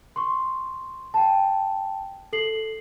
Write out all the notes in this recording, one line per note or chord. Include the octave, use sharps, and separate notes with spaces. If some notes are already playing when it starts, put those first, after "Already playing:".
C6 C#6
G5 A5
A4 C7 F#7